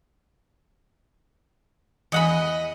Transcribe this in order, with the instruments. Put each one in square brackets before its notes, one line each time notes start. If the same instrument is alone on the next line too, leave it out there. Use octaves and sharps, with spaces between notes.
[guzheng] E2 F#5 B5 [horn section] D#5